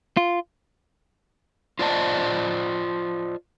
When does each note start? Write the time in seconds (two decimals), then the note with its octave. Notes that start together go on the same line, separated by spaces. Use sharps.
0.17 F4
1.79 F4 C5 D5 D#5 A5